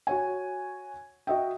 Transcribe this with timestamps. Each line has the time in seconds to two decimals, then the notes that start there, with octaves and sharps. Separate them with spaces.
0.07 F#4 C#5 G#5
1.27 F#4 D#5 E5 G5